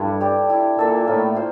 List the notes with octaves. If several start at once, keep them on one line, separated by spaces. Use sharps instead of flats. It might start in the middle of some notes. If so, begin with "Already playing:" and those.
Already playing: G2 D4 E4 A4
G4 D5
E4
A#2 A4 E5
A2 A#3
F4 C5